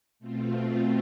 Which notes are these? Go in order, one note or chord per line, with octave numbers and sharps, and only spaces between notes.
B2 A3 C4 F4